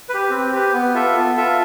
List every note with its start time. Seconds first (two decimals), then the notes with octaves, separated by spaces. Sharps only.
0.09 G4 B4
0.30 C4
0.52 G4 B4
0.73 B3
0.94 F4 A4 E5
1.15 B3
1.37 F4 A4 E5